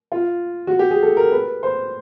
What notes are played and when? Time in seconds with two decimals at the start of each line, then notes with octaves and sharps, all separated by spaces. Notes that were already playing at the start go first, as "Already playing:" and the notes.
0.12 F4
0.67 F#4
0.79 G4
0.91 G#4
1.02 A4
1.17 A#4
1.32 B4
1.63 C5